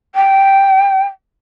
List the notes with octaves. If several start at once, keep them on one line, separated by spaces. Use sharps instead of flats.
G5